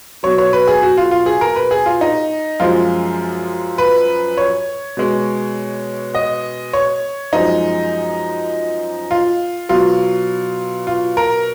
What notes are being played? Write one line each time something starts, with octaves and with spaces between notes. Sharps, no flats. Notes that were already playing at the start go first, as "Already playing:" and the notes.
B2 F#3 C#5
C#5
B4
G#4
F#4
F4
F4
G#4
A#4
B4
G#4
F4
D#4
F#2 F3 G#3 F4
B4
C#5
B2 G#3
D#5
C#5
F#2 F3 G#3 D#4
F4
B2 F#3 F4
F4
A#4